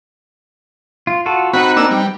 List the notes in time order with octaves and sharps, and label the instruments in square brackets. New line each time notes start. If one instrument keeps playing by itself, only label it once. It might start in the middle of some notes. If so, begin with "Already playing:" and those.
[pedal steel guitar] F4
F4 F#4 A4
[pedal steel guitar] C4 D#4 B4 [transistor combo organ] F#4 B5
[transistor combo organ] A#3 D4 E6
G3